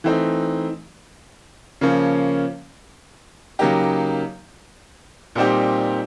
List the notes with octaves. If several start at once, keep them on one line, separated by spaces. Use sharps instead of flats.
E3 A3 C4 D#4
C#3 F3 A#3 C#4
C#3 F#3 A#3 D#4 G4
A#2 G3 C4 D#4 G4